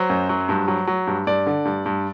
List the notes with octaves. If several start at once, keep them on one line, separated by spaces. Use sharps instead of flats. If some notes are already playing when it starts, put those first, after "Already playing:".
Already playing: F#3 C5
F#2
F#3
G2
F#3
F#3
G2
G2 D5
D3
G2
G2